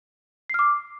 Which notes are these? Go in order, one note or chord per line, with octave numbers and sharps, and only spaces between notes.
D6 F6 C7